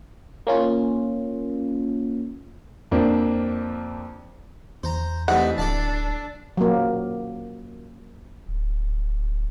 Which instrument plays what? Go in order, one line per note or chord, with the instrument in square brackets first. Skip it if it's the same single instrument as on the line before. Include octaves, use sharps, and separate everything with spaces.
[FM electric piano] A#3 C#4 F4
[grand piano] F2 F3 A#3 C4 D4
[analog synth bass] E2 [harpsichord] C5 A#5
[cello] E3 A3 [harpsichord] G3 C4 D#4 [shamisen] F#5
[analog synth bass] D1 [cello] D4 [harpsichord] A4 D5 A5
[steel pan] F#3 A#3
[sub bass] D1